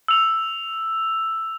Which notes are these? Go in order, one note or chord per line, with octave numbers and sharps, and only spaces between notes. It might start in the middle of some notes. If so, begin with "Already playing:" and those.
E6 F7